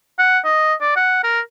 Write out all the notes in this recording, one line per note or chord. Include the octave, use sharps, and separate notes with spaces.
F#5
D#5
D5
F#5
A#4